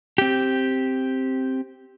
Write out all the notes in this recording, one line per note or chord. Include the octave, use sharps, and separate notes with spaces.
C4 G4